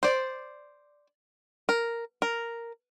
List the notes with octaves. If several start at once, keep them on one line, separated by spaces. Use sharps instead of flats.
C5 D5
A#4
A#4